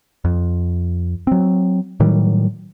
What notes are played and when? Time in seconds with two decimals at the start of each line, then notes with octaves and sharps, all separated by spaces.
0.25 F2
1.27 F#3 C4
2.00 A2 D#3 F#3 G3